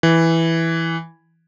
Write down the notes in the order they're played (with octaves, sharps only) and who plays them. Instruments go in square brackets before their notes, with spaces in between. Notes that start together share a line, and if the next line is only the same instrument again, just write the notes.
[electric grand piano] E3